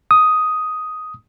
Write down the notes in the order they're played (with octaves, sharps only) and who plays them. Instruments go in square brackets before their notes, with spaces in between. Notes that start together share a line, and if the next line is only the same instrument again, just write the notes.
[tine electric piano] D#6